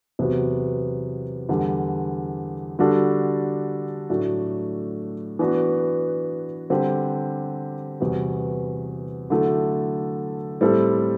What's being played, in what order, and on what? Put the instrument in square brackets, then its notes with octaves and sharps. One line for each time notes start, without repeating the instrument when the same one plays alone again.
[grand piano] E2 C3 F#3 B3 F#4
E2 D3 G3
D3 G3 D4 F#4 A4
A2 F#3 A3 D4 F#4
E3 B3 D4 F#4
D3 G3 C4 G4
E2 C3 G3 B3 F#4
D3 F#3 A3 E4 A4
A2 G3 C4 E4 A4